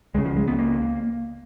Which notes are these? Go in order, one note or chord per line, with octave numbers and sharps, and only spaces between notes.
C#2 C#3 G#3
F3
G#3
B3
A#3